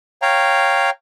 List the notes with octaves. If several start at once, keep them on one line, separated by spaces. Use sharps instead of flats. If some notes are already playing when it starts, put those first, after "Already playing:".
C#5 F5 G5 A#5